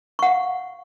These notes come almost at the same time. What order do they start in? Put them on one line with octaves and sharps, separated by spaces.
C#6 F#5 F5